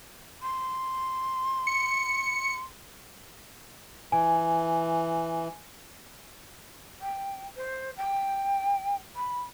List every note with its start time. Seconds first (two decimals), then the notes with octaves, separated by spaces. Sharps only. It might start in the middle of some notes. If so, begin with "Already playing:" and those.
0.42 C6
1.67 C#7
4.12 E3 G#5
7.01 G5
7.56 C5
7.96 G5
9.15 B5